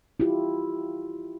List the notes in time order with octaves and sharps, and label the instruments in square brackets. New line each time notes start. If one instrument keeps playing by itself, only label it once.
[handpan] E4 F4 G4